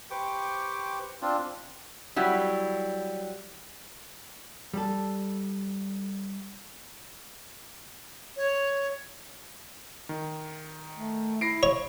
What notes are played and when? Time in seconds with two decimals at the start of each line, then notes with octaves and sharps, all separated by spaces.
0.11 G4 B4 C5 G5 C#6 D6
1.22 C4 D4 F4
2.16 F#3 G3 E4 F#5
4.74 G3 A4
8.37 C#5
10.09 D#3
10.97 A3
11.41 E4 A#6 C7 D7
11.63 C#5